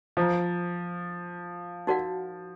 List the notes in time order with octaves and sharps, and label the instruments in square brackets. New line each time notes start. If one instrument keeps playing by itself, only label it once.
[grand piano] F3 [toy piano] C5 F5 A#5
[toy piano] D#4 F#4 A#4 D5 F#5